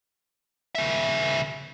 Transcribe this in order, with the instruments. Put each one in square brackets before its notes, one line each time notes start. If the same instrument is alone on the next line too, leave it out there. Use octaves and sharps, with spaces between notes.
[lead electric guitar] C#3 E5